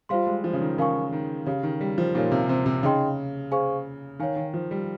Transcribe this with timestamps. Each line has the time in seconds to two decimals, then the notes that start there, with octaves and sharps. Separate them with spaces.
0.09 G3 F4 C5 F5 C6
0.27 G#3
0.44 F3
0.53 C#3
0.61 D#3
0.78 C#3 D#4 A#4 F5 G#5 C#6
1.12 D#3
1.46 C#3 G4 C#5 F5
1.63 D#3
1.81 G3
1.98 F3
2.14 A#2 D#4 G4 A#4 C#5 F5
2.32 C3
2.49 C3
2.66 C3
2.83 C#3 D#4 G#4 D#5 G5 C6
3.52 G#4 C5 F5 G#5 C#6
4.19 D#3 C#5 F5 G#5
4.36 D#3
4.54 F3
4.71 G3